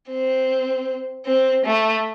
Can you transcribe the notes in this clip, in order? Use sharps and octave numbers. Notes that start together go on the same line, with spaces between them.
C4
C4
A3